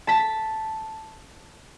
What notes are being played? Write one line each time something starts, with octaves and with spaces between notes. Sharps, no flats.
A5 B6